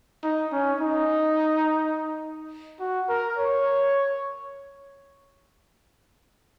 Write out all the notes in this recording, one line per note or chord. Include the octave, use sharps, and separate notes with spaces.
D#4
C#4
D#4
F#4
A#4
C#5